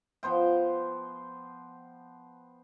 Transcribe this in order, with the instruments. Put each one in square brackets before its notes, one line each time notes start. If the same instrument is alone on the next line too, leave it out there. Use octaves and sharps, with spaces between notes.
[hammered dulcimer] F3 B3 C5 G5